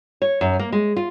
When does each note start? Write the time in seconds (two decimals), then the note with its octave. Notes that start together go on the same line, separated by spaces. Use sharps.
0.22 C#5
0.41 F#2
0.59 A#3
0.72 G#3
0.96 F4